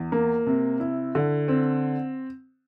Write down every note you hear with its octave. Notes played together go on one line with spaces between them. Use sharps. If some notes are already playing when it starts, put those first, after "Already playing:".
Already playing: E2
A#3
C3
E4
D3
C4